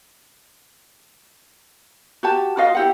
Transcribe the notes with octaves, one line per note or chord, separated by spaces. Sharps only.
F#4 G4 A5
F4 F#4 D#5 F5
E4 G4 F#5